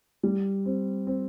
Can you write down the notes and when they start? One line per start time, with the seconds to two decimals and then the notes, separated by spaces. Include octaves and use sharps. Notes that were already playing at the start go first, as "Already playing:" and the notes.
0.23 G3
0.66 C4
1.07 C4